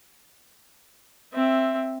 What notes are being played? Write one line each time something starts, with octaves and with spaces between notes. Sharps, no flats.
C4 E5